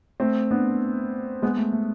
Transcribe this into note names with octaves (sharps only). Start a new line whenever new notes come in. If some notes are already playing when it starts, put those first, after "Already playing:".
A3 C4
B3 D4
G#3 B3
A3
A3